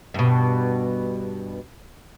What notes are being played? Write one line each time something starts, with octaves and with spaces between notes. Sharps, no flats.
G2 B2